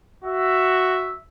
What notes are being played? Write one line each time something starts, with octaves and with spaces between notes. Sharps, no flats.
F#4 E5